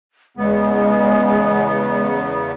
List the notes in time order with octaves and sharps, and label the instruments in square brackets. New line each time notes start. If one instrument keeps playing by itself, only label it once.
[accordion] E2 C#3 B3 [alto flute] G#3